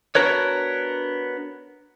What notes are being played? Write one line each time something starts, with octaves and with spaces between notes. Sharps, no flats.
B3 D4 F#4 A#4 B4 C#5